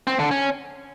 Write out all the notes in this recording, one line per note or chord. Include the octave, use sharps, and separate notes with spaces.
C4
D3
C#4